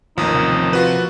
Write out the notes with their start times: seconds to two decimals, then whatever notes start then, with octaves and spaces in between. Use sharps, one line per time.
0.18 A1 D#2 F3 A#3 D#4
0.34 C3
0.73 F4 F#4 B4